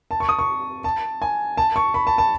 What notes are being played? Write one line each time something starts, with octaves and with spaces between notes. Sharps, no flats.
A5
C#6
D#6
C#6
A5
G#5
A5
C#6
B5
A5
A5